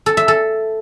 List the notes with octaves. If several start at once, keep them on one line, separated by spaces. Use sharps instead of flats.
A4
E5
A4